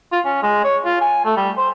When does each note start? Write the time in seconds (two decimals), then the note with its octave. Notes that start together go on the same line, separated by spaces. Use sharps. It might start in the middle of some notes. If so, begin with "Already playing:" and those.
0.12 F4
0.25 C#4
0.42 G#3
0.64 C#5
0.85 F4
1.01 G#5
1.25 A3
1.36 G3
1.57 C5